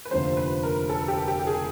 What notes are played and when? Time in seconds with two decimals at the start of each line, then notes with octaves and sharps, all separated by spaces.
0.05 B4
0.11 F1 D#2 D3 F3 C5
0.37 B4
0.63 A#4
0.90 A4
1.08 G4
1.28 G4
1.40 G4
1.47 G#4